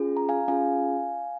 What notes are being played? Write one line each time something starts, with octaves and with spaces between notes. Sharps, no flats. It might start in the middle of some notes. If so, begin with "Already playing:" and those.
Already playing: C#4 F4 G#4
A#5
F5 G#5
C#4 F4 G#4 F5 G#5